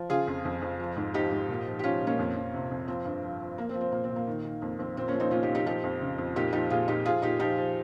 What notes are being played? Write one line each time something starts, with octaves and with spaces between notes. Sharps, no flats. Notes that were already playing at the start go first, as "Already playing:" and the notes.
Already playing: F3
C#3 F4 G#4
F2
F2
F2
F3
G#2
F3 D#4 G4
G#2
A#2
F3
G4
F3 C#4 F4
A#2
A#3 C#4
F2
F2
C3
F2
F3 C4
G2
F3
F3
F3 A#3
C4
F3
C4
A#2 A#3
C4
A#2
A#3
D#3
D#3
F2 A#3
F2 C4
A#2 C4
A#3 C#4
F3
C4 D#4
A#2 C#4 F4
D#4 G4
A#2
D#4 G4
F3 D#4 G4
F2
C#3
F2
A#2 D#4 G4
F3 D#4 G4
A#2 F4 G#4
A#2 D#4 G4
F3 F4 G#4
A#2 D#4 G4
F3 D#4 G4
F3